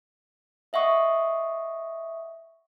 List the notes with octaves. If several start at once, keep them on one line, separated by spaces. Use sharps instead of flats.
D#5 E5 F#5 C#6 D#6